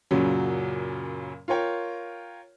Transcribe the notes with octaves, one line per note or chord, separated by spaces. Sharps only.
F#2 A#2 C#3 F#3
F4 A#4 C#5 G5